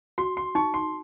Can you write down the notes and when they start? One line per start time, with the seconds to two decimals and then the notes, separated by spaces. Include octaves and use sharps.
0.18 F#4 C6
0.37 C6
0.55 D#4 C#6
0.74 C6